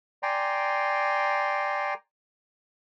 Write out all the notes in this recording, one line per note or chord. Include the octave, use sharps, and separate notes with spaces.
D5 G5 G#5 A#5 C6